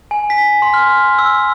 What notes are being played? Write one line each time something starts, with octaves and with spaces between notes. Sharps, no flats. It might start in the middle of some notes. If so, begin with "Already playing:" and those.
G#5
B6
C6
F6
E6